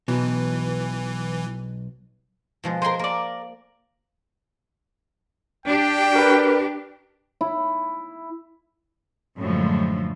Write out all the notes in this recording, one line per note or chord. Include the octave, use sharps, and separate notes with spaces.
B1 B2 E3
B2 F3 G#3
G#3 A#4 C5 G#5 C6
A#3 A#4 D5
D4 G4 G5
A#4 B4
E4
F#2 A2 D3 F3 F#3 G#3